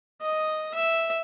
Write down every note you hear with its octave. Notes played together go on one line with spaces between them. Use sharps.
D#5
E5